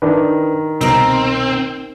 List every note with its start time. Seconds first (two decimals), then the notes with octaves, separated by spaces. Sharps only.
0.02 D#3 D4 E4 B4
0.81 C2 B2 C4 D#4 A#4